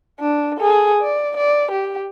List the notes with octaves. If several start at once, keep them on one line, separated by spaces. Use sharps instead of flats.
D4
G#4 A4
D5
D5
G4